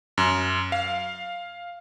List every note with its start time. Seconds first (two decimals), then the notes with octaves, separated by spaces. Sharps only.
0.18 F#2
0.72 F5